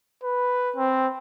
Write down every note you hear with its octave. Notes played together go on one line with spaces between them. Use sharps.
B4
C4